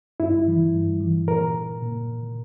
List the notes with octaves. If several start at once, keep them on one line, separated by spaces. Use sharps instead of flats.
G2 E4
E3
G2
E3
A#2 A#4
A#2